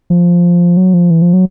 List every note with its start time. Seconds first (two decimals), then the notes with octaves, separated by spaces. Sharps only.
0.10 F3
0.77 F#3
0.94 F3
1.10 E3
1.22 F3
1.33 F#3